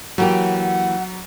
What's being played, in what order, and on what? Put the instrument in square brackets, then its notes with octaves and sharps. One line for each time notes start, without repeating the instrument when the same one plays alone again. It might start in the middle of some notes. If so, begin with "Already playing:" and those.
[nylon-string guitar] E3 A#3 G4 [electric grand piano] F#3 [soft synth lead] F#5